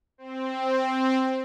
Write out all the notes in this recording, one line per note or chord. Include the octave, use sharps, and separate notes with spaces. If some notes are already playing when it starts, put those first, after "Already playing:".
C4